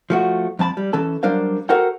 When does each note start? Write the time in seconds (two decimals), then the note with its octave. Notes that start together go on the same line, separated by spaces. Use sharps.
0.10 F3 A3 F#4
0.59 F2 F3 A5 B5
0.77 G3
0.93 E3 C#4 A4 A5
1.23 F#3 G3 D4 A#4 C5 F5
1.69 F#4 A4 A#4 C5 F#5 G5